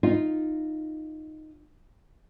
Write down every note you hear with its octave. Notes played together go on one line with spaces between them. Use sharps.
D#4 F4